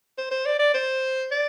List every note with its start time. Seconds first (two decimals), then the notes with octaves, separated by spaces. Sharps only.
0.18 C5
0.31 C5
0.46 D5
0.59 D5
0.74 C5
1.31 D5